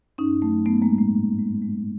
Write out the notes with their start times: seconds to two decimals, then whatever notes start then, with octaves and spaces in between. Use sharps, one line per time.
0.18 G2 C#4 D#4
0.42 F#3 A3
0.66 F#3 A3 B3
0.82 G#3 A#3
0.90 A2
0.98 A3
1.15 G#2
1.39 G#3
1.62 G#3